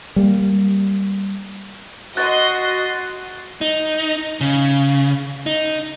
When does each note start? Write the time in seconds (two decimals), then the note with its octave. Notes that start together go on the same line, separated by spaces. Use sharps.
0.16 G3 A#3
2.17 F#4 D#5 C6 F#6 A6
3.61 D#4
4.41 C#3
5.46 D#4